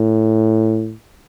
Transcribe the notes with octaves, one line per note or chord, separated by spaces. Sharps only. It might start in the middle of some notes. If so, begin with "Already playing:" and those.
Already playing: A2